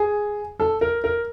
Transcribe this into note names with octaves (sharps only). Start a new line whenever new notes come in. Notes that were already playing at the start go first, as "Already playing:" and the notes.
Already playing: G#4
A4
A#4
A#4